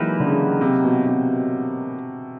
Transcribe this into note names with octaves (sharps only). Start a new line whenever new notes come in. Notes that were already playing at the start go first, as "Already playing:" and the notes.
Already playing: E3 F#3 G#3 A#3 D#4 G4 B4
D3
C#3
C3
B2
C3